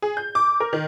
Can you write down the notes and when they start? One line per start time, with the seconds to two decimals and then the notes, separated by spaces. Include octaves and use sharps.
0.02 G#4
0.17 G6
0.35 D6
0.60 A#4
0.73 D#3